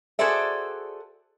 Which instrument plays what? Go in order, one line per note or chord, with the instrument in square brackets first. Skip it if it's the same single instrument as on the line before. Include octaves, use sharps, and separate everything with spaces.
[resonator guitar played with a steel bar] F#4 G#4 A4 C5 D5 E5